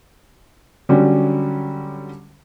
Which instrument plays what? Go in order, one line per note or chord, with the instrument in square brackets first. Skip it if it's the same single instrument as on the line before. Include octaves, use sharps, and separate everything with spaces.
[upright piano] D3 F#3 G3 C#4